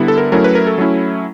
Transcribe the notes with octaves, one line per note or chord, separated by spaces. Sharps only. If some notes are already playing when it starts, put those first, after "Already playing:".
Already playing: D3 G3 B3 E4
A4
A#4
F#3 A3 C#4 E4 A#4
B4
A#4
A4
F#3 A3 C#4 E4